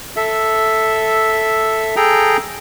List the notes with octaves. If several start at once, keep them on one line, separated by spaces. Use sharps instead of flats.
A4 E5
G#4 A4 G5 A#5